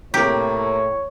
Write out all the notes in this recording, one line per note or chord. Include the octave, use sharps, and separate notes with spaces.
A2 C3 A#3 G4 C#5